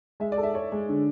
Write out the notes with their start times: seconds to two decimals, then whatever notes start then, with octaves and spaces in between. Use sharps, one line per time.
0.20 G#3 E5
0.32 D5
0.38 A4
0.43 E5
0.54 C#5 D5
0.72 G#3
0.89 D3